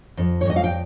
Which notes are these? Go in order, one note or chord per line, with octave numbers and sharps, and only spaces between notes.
F2
C#5
F2 D#5
F5
G5